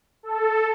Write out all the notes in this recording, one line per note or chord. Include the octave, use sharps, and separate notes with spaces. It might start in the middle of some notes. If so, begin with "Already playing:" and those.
A4